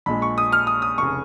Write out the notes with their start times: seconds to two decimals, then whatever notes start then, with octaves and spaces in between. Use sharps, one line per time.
0.06 A#1 A#2 G#3 B5
0.22 C#6
0.38 D#6
0.52 F6
0.67 D#6
0.82 D#6
0.98 F1 C#3 C#6